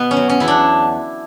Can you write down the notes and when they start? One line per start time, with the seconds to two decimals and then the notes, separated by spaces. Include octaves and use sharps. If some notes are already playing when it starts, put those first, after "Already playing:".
Already playing: B2 B3
0.11 C#4
0.17 F#3
0.29 C#4
0.40 E2 E4
0.48 D4